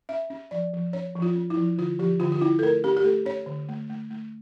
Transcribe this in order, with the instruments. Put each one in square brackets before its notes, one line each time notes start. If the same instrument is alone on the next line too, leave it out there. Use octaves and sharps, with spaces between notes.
[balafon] C#4 E5
C#4
F3 D5
F3
C#4 C#5
F3
F4
C#4
E4
F3
D3 F4
F3 G4
D3 F4
F4
C#4 E4
A4
A3 A#4
C#4 G4
G4
A3 A4
C#4 C#5
D3
A3
A3
A3